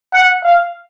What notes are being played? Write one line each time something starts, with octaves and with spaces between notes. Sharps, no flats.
F#5
F5